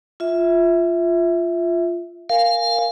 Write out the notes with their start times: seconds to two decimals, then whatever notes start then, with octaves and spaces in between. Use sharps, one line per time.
0.20 F4 E5
2.29 A#4 F5 G#5